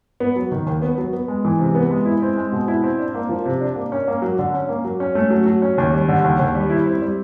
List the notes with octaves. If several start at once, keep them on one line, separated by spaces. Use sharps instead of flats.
B3
F#3
D#3
D#2
B3
F#3
B3
G#3
E3
C3
B3
G#3
E4
C4
G#3
B2
E4
C4
D4
A#3
F3
C3
D4
A#3
C#4
A#3
F#3
D3
C#4
A#3
F#3
C#4
A3
F#3
F#3
C#4
D#2
G3
D3
D#2
D#2
G3
E4
C4
G3